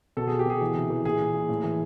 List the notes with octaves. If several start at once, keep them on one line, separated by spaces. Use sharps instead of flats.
B2 A4
B2 G#4
G4
B2 G#4
E3
C3
E3
A#2 G#4
A#2
A#2
A2
E3